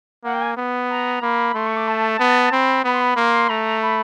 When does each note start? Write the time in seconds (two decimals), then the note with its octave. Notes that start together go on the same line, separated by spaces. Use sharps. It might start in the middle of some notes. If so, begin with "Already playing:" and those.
0.24 A#3 F#5
0.33 G5
0.41 G#5
0.57 B3
0.90 A#5
1.22 A#3 B5
1.55 A3 C6
1.66 C#6
1.76 D6
1.87 A5
2.19 B3
2.52 C4 B5
2.84 B3 B5
2.93 C6
3.01 B5
3.17 A#3 C6
3.49 A3 A#5
3.81 B5